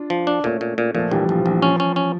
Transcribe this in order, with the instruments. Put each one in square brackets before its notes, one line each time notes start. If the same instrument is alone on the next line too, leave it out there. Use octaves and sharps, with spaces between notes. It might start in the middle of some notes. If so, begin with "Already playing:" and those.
Already playing: [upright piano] D4 F4
[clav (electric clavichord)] F3
D4
[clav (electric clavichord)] A#2 [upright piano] A3 C#4
[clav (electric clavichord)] A#2
A#2
[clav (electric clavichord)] A#2 [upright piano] F3 A3
[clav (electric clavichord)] A#1 [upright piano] E3 G3
[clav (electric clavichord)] A#1 [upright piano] F3
[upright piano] F3
[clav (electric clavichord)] A#1
[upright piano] E3
[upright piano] F3 [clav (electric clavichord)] C#4
[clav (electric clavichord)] C#4
C#4